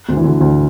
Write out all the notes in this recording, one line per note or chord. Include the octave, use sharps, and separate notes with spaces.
D2 D3
E3
D2 D3
D2 D3